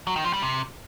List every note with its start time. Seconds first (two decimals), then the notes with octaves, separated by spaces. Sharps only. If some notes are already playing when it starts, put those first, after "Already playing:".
0.07 F#3
0.16 D#3
0.25 F3
0.33 G3
0.42 C3